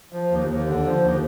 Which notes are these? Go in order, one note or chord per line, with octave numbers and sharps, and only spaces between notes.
F3
D#2
D#2
D3
F3
D#2